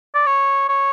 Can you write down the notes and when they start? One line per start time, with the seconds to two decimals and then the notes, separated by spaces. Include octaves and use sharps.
0.15 D5
0.26 C#5
0.69 C#5